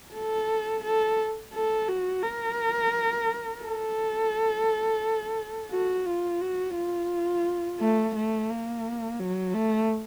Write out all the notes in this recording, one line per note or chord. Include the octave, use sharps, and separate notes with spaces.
A4
A4
A4
F#4
A#4
A4
F#4
F4
F#4
F4
A3
A3
A#3
F#3
A3